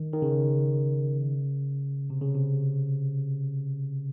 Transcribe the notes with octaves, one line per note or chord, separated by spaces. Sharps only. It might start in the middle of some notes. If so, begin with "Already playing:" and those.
Already playing: D#3
D#3
C#3
C3
C#3
C3